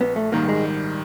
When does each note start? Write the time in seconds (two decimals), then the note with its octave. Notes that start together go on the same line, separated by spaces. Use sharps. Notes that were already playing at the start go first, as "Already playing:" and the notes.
0.01 A#1 B3
0.16 A3
0.32 G#2 D#3 G3 A#3
0.48 G#3